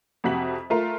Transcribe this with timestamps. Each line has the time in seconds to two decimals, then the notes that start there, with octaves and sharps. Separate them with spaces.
0.24 F2 C3 F#4 B6 F#7
0.70 A3 F4 A#4